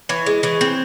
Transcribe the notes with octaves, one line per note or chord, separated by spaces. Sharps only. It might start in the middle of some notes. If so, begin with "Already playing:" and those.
E3 C#5
G#3
E3 C#5
C4